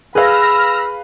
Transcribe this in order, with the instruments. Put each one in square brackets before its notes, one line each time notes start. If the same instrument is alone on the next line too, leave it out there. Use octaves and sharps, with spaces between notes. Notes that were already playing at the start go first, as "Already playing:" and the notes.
[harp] G#4 [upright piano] B4 F5 [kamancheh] B5 [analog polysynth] E6 F6 A#6